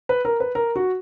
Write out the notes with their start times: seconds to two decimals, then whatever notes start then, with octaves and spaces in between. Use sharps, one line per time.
0.09 B4
0.25 A#4
0.40 B4
0.55 A#4
0.76 F#4